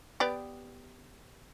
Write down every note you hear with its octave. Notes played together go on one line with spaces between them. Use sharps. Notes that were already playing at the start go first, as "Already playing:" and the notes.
B3 G4 D5